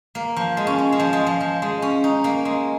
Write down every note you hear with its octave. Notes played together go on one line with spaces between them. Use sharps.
A#3
F3
G#3
C#4
C#4
G#3
F3
G#3
F3
F3
G#3
C#4
D#4
A#3
G#3